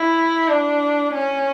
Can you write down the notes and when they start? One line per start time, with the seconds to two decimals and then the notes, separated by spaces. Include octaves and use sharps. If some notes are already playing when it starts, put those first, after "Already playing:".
Already playing: E4
0.48 D4
1.14 C#4